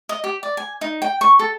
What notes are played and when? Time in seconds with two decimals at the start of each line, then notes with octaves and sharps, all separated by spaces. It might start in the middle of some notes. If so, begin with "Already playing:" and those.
0.09 D#5
0.24 G4
0.43 D5
0.57 G#5
0.81 D#4
1.02 G5
1.21 C#6
1.39 A4